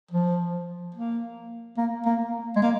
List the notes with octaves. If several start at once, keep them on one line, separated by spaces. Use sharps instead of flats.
F3
A#3
A#3
A#3
G#3
A#3